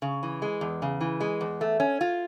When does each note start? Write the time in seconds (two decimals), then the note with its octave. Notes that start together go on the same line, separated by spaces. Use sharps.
0.02 C#3
0.23 E3
0.42 G#3
0.61 E2
0.82 C#3
1.01 E3
1.21 G#3
1.41 E2
1.61 A3
1.80 C#4
2.01 F4